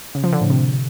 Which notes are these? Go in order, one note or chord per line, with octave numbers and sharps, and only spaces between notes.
C#3
F3
D3
A2
C3